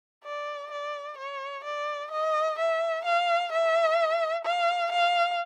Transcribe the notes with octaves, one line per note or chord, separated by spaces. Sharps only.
D5
D5
C#5
D5
D#5
E5
F5
E5
F5
F5